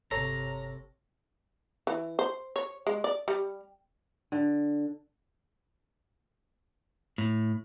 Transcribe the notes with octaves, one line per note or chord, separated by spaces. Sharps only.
G1 C3 A4 C#5 A#5 A#6
E3
C5
C#5
G#3
D5
G3
D3
A2